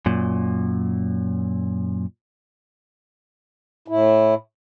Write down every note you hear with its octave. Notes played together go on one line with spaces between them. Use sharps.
F#2 A#2
A2 E4